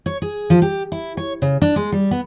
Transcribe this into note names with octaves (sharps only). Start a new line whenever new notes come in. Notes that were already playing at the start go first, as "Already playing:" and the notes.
C#5
G#4
F3
G4
E4
C#5
C#3
D4
G#3
G3
B3